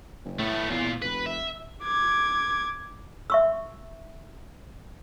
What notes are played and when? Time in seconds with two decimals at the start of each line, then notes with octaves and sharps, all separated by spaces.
0.25 F#1
0.39 A2 A3 B3
0.70 E2 A#2 F4
1.02 F1 B4
1.26 E5
1.84 D6 G#6
3.30 E5 C#6 E6